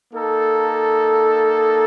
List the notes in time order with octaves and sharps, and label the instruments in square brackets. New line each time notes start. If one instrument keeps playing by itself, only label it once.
[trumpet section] A#3 D#4 A4